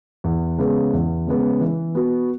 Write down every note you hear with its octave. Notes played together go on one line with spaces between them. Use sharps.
E2
C#3 G#3 B3
E2
C#3 G#3 B3
E3
B3 F#4